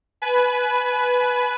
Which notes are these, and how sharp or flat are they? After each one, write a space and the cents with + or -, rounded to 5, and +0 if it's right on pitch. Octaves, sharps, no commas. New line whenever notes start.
B4 +0 G#5 +35